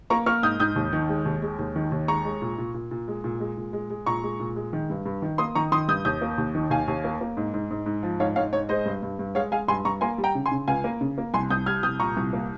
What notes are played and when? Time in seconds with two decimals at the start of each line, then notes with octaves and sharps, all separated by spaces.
0.10 A#3 A#5 C#6
0.26 A#3 C#6 F6
0.43 G#2 D#6 G6
0.60 G#2 D#6 G6
0.76 D#2
0.93 D#3
1.09 G#3
1.26 D#2
1.42 G#3
1.59 D#2
1.76 D#3
1.92 D#2
2.08 G#3 A#5 C#6
2.25 G#3
2.42 A#2
2.58 A#2
2.74 A#2
2.91 A#2
3.08 G#3
3.24 A#2
3.40 G#3
3.57 A#2
3.73 G#3
3.90 G#3
4.06 A#2 A#5 C#6
4.23 G#3
4.40 A#2
4.56 G#3
4.73 D#3
4.90 G2
5.06 G2
5.22 D#3
5.38 A#3 C6 D#6
5.55 D#3 A#5 C#6
5.72 D#3 C6 D#6
5.88 G2 D#6 G6
6.05 D#2 D#6 G6
6.22 A#3
6.38 D#2
6.55 D#3
6.70 D#2 F5 G#5
6.88 D#2
7.04 A#3
7.21 A#3
7.37 G#2
7.54 G#2
7.71 G#2
7.86 G#2
8.03 F3
8.20 G#2 C#5 F5
8.36 G#2 C#5 F5
8.53 G#2 C#5
8.69 G#3 C5 D#5
8.86 G2
9.03 G2
9.19 G2
9.35 G#3 C#5 F5
9.52 G#3 F5 G#5
9.68 G2 G#5 C6
9.85 G2 A#5 C#6
10.01 A#3 G#5 C6
10.18 G3
10.24 G5 A#5
10.35 C#3
10.46 G#5 C6
10.51 C#3
10.68 C#2 F5 G#5
10.84 A#3
11.01 C#3
11.18 A#3
11.34 C2 G#5 C6
11.50 C2 D#6 G6
11.66 G3 F6 G#6
11.83 C2 D#6 G6
11.99 A#2 A#5 C#6
12.17 C2
12.33 A#3